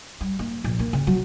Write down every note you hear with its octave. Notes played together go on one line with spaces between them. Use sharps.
G3
A#3
A#1
A#3
C#3
F#3